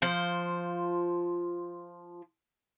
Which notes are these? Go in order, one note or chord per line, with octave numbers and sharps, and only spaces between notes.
F3 C5